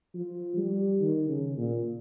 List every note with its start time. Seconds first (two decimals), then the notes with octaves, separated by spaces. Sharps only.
0.15 F3
0.57 G3
1.01 D#3
1.29 C#3
1.57 A#2